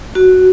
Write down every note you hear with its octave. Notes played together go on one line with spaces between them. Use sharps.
F#4